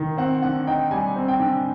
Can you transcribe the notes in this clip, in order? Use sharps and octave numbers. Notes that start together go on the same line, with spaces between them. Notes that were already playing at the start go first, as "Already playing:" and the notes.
Already playing: D#3
C4 F#5
D3 F#5
D#4 G5
G3 G#5
C4
G5
D3